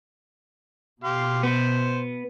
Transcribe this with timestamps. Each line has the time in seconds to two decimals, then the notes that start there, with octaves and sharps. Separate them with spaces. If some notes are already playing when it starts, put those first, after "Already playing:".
1.04 B2 G4 F5 C6
1.43 B3 C5